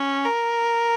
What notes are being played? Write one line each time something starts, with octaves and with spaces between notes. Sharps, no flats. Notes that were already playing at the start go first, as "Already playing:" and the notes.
Already playing: C#4
A#4